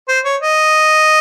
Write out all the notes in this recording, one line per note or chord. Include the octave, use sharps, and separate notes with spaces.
C5
C#5
D#5